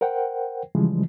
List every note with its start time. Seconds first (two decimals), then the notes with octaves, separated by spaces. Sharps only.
0.01 A#4 C5 F#5 G5
0.75 C#3 E3 F3 G3 G#3